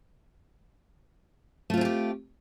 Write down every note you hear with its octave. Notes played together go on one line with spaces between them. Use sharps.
A3 C4 F4 G4 G#4